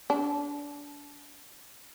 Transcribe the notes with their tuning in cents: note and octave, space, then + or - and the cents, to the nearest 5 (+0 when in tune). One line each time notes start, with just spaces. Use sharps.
D4 -25